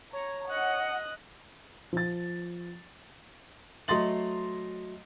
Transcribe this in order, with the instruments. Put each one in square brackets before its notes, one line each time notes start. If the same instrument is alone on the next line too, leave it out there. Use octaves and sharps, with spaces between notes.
[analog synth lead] C#5 [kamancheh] A#5
[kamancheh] D#5 F#6 [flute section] F#5
[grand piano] F3 A6
F#3 A3 D#5 C6 A6 F#7